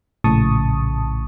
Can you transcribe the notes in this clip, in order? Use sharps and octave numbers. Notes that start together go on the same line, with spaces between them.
A#1 A2 C#3 A5 C#6 D#6